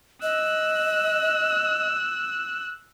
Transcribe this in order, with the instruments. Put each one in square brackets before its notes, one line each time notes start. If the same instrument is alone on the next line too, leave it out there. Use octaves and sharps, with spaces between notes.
[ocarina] D#5 [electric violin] E6 F#6